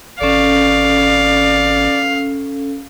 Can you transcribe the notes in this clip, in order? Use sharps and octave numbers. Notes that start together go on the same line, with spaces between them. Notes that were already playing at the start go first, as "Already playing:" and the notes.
G#1 C#4 A4 D5 F5